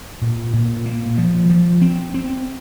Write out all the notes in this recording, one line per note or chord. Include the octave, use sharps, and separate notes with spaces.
A#2
A#2
A#3
F3
F3
C4
C4